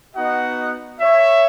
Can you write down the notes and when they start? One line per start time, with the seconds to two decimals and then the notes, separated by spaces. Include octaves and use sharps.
0.14 B3 D#4 F#4 D#5 F#5
1.01 C#5 E5